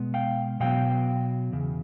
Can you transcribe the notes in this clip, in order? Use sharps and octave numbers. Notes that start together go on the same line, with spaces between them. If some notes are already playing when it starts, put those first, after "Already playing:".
Already playing: B2 G#3 B3
F5 G5
B2 F#3 B3 F5 G5
E2 C#3